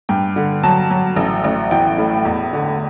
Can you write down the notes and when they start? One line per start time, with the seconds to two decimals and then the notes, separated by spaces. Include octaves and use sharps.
0.09 G2 G5
0.36 D3
0.63 F#3 A5
0.91 F#3
1.16 A1
1.44 A1
1.71 E3 G5
1.98 A2
2.25 E2
2.53 D3